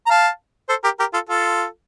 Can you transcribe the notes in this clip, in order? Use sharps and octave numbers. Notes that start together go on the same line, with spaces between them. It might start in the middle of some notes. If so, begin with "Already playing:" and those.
A#5
F5 A5
A4 C5
G4 A#4
G4 A#4
F4 A4
F4 A4